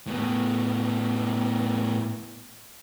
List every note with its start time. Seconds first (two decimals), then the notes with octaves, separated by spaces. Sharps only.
0.07 A2 B3